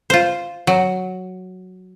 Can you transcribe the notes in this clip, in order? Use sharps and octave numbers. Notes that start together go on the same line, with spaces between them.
F4 C5
F#3